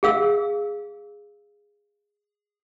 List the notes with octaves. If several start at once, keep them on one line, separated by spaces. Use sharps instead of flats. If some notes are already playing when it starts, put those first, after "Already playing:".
G#4 F5 E6